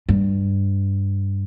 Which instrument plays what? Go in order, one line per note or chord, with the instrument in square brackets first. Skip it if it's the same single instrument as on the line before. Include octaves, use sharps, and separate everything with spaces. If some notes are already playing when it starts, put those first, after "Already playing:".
[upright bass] G2